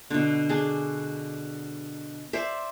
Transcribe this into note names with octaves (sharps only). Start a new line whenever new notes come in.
B2 D3
D4 G#4
C5 D5 E5